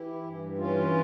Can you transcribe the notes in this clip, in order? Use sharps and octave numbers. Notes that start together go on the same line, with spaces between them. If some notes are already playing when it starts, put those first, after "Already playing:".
Already playing: E3 E4 G4
G2
E3 C#4 F4